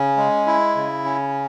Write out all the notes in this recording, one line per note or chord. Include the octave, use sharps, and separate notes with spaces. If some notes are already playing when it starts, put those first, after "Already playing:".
Already playing: C#3 C#4
G#3
E4
C#3
C#4